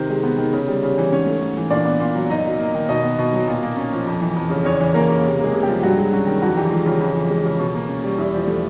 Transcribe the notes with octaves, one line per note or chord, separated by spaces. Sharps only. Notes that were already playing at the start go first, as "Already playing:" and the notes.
Already playing: C3 D#3 C4 C5
G#3
B3
D#3
C#3
G3
C#3
E3
G#2 C#4 C#5
A3
G#2
E3
A#2 D4 D5
B3
A#2
F#3
F#2 D#4 D#5
F#3
A#3
D#3
B2 D#4 D#5
B3
B2
F#3
A#2
A#3
C#4
F3
F2
E3
F2
C#3
E2 C#4 C#5
E3
E2 A#3 A#4
C#3
C3
G#3 A#3 G#4
C3
G3 G4
F3
G2 F#3 F#4
G#3
F#3 C#4 F#4
D#3
F2 F#3 F#4
E3 G3 G4
G#3 F4
C#3 F4
F2
E3
G#3
C#3
B2
A#3
C#4
G3
E2 E4
F3
A3